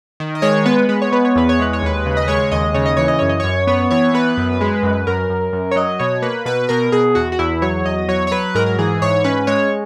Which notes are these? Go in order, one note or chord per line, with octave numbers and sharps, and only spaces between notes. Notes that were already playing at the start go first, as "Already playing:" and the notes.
D#3
D#5
G#3 C#5
B3 B4
G#3 B4
C#5
B3 B4
C#5
E2 B4
C#5
G#3 B4
C#5
D#2 B4
C#3
D#5
G#3 C#5
D#2 D#5
C#3 C#5
D#5
E3 C#5
D#5
F#2 C#5
D#5
F#2 C#5
B3 C#5
E3 C#5
B3 B4
F#2
G#3
F#2
F#2 A#4
F#2
F#2
C#5
F#3 D#5
B2 C#5
A#3 B4
B2 B4
B2 A#4
B2 G#4
E2 F#4
F#4
E2 E4
F#3 C#5
E2 D#5
F#3 C#5
C#5
F#3 B4
G#2 A#4
A#4
E3 G#4
G#2 C#5
C#4 B4
G#3 C#5